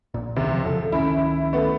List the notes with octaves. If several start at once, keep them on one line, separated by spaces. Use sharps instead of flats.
A#1 A#2
C#2 C3 D#3
C#3 F3
F2 C#3 F3 A4
C#2 D#3 C#4 E4
A3 B3